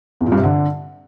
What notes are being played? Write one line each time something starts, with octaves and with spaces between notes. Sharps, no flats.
E2
A#2
G2
C3
D3